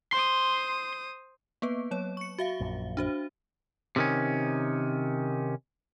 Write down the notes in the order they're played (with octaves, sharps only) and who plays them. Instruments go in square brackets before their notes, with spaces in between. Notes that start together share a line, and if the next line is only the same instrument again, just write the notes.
[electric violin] C5 D#6 [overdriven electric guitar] C6
[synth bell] A#3 B3 B4
F#3 C#5
C#6 C#7
F#4 E5 F5
[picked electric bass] A#1 F#2
[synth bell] D4 F#4 C5
[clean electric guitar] C3 D#3 C#4